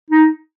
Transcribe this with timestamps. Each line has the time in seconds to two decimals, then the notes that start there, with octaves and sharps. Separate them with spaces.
0.10 D#4